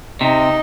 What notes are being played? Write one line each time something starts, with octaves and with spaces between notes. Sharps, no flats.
C3 D#4